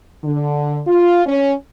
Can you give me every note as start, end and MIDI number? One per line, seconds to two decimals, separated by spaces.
0.24 0.80 50
0.87 1.26 65
1.26 1.53 61